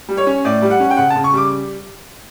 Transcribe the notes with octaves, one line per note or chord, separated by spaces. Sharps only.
G3
C#5
C#4
A2 D5
G3
F#5
C#4
G5
C#3 F#5
A5
C#3
C#6
G3 D6